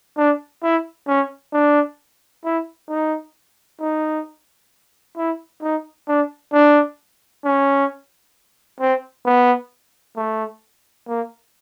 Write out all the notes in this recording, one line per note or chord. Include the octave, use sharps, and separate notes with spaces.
D4
E4
C#4
D4
E4
D#4
D#4
E4
D#4
D4
D4
C#4
C4
B3
A3
A#3